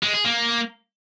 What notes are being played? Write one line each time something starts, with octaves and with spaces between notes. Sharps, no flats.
G#3
G#4
A#3